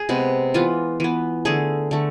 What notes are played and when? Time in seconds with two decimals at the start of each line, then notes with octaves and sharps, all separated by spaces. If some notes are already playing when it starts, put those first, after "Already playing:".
Already playing: G#4
0.09 C3 G#3 B3
0.54 E3 B3 F4
1.00 E3 B3
1.45 D3 A3 G#4
1.91 D3 A3